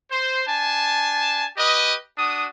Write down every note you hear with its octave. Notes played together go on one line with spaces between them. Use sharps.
C5
D4 G#5 A5
G4 B4 D#5
D4 F#4 D#6